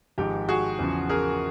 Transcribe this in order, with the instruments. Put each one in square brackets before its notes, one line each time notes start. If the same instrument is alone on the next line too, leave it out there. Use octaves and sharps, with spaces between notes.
[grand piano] G#1 G#2 F3 G#3 G4
F#4 G#4
E2 C#3 F3
G#4 A#4